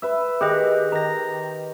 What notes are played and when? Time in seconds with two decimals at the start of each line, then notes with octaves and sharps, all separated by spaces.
0.02 B4 E5
0.41 D#3 G4 G#4 B4 D#5
0.92 D#3 A#5 A#6